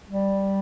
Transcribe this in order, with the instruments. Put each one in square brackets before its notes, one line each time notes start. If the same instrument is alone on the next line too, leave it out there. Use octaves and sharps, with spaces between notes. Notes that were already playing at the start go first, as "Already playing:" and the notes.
[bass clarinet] G3